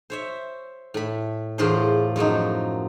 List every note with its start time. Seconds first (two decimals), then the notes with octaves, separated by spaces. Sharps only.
0.10 C5 C#5 E5
0.94 A2 B5
1.58 E2 A2 F4 G#4 A#4 C5
2.16 F#2 F3 F#3 D#4